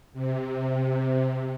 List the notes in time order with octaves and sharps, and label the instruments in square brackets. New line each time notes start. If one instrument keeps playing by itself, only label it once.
[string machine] C3